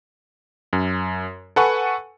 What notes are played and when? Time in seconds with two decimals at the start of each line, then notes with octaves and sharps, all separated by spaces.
0.73 F#2
1.56 A4 B4 F#5 G#5 C#6